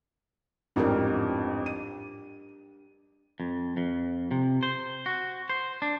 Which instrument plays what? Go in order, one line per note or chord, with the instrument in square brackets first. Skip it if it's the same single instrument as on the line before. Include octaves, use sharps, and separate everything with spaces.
[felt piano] A1 F2 G#2 [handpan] D4 G4 A#4
[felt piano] D#7
[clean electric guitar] F2
F2
C3
C5
F#4
C5
D4